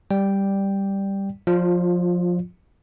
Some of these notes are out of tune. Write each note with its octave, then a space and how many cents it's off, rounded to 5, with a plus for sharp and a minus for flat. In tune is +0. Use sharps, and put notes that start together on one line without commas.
G3 +5 D5 +0 G5 +0
F3 +25 F4 +0 D5 +10